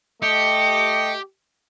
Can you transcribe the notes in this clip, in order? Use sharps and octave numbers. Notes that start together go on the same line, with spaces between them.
A3 G4 D#5 C#7